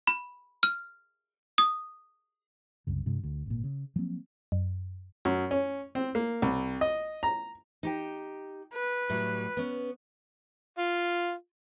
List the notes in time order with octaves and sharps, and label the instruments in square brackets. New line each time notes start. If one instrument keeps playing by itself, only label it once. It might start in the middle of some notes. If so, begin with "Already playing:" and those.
[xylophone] B5
F6
D#6
[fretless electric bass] C2 F#2 C#3
G2 C3 G#3
D2
G#1 A#2
C#3
F3 F#3 A#3 C4
[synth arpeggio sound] F#2
[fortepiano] F#2
C#4
C4
A#3
C2
D#5
A#5
[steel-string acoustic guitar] D#4 G4 G5
[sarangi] B4
[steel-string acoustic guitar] A2 F#3 G3
B3 C#4
[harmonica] F4